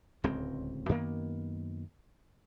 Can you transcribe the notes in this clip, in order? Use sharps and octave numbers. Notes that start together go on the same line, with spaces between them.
D1 C#2 G#3 C4
F#2 D#3 A#3 B3